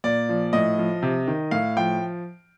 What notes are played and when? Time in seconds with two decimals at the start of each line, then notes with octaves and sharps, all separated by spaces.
0.04 A#2 D5
0.29 F3
0.53 A2 D#5
0.78 F3
1.03 C3
1.28 D#3
1.51 A2 F5
1.77 F3 G5